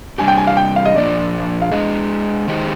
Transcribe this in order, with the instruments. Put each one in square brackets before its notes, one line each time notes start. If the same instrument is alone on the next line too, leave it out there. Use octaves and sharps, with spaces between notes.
[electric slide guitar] C3 G3 D4 G4 [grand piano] G#5
[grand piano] G5
G#5
F5
G5
F5
D#5
[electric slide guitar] A#2 F3 A#3 D4 F4 [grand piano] D5
[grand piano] F5
[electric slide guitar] G#3 D4 G#4 [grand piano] D#5
[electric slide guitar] D#3 G#3 D#4 G4 C5